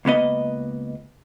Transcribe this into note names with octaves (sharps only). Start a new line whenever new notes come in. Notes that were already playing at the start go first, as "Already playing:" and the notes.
C#2 A#3 B3 D#5